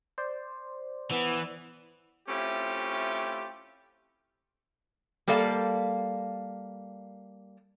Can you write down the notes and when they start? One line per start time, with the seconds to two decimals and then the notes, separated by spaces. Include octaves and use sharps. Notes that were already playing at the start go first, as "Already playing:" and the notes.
0.18 C5 D5
1.11 E3 B3
2.29 A3 C4 C#4 E4 F4 G4
5.28 G3 A#3 A4 D5 F5 A5